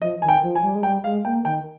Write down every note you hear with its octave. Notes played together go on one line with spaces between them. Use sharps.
F3 D#5
D#3 G#5
G5
F3
G#5
G3
G#3
G3 G5
G#3 F5
A#3 G5
D#3 G5